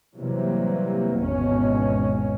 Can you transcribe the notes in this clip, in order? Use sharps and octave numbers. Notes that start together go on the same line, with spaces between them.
C3 E3 F#3 G3 A#3
G#1 E2 B2 G#3 C#4